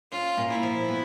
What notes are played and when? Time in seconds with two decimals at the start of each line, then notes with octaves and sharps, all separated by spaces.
0.12 C#4 F4
0.37 A#2
0.50 E4
0.63 F3
0.88 B3